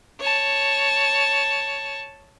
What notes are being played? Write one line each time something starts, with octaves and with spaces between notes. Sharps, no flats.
C#5 A5